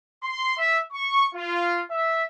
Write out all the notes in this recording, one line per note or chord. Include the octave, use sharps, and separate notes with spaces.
C6
E5
C#6
F4
E5